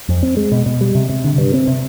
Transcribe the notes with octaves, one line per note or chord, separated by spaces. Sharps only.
F2
C4
G#3
B2
B2
G3
C3
C3
D3
G2
C4
C3